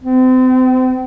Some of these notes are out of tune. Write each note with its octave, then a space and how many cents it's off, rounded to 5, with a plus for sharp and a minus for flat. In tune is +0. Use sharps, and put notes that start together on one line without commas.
C4 -35